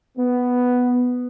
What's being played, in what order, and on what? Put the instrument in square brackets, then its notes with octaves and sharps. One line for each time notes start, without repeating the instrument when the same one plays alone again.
[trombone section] B3